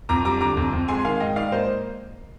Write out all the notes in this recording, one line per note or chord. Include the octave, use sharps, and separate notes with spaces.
F2 A#5 D6
G3 A#5 D6
D3 A#5 D6
F2
F2
G#3 G#5 C6
D#3 F5 G#5
G#2 D#5 G5
G#2 D5 F5
A#3 C5 D#5